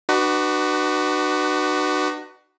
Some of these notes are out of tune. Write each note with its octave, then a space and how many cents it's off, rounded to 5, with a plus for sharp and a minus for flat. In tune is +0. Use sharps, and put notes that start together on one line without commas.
D4 +45 F#4 +20 B4 +0